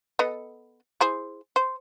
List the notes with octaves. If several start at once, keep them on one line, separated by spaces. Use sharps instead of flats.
B3 A4 D#5
E4 G#4 C5
C5